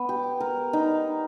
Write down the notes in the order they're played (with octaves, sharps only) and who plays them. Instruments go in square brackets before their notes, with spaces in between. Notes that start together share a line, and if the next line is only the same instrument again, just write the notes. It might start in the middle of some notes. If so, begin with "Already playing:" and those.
Already playing: [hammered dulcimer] B3
G4
A#4
D#4